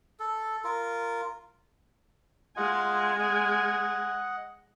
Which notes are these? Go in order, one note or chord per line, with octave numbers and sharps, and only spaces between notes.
A4
F4 A#4
G#3 F4 D#5 F#5 G#5
D#5 F#5